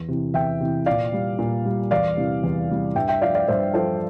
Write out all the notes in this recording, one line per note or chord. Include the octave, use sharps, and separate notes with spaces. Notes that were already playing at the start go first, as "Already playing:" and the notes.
Already playing: E2
C3 E3
E2 E5 G5
C3 E3
A#2 D5 F5
G3
A#2
G3
E2 D5 F5
C3 E3 G3
E2
C3 E3 G3
G2 E5 G5
E5 G5
F3 D5 F5
D5 F5
G2 C5 E5
F3 A4 C5